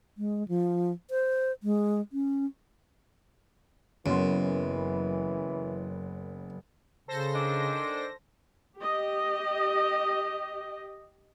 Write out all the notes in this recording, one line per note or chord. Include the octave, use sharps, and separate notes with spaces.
G#3
F3
C5
G#3
C#4
F#1 F#2 E3 B3 C6
C#3 A4 C5 A#6
D#3 G#3 D4
G4 D#5